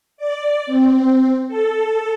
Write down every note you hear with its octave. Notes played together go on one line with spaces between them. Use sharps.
D5
C4
A4